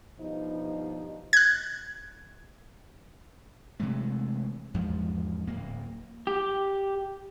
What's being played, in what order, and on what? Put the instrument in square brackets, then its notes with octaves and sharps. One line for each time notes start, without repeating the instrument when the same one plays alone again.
[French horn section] G2 B2 F3 D#4
[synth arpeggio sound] F#6 G#6
[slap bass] C3 E3 G#3 A3
E2 G#2 F3
D1 A#3
[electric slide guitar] G4